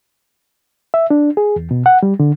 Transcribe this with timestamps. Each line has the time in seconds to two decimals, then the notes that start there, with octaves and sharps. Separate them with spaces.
0.94 E5
1.10 D4
1.37 G#4
1.56 E2
1.71 B2
1.86 F#5
2.03 G3
2.20 D3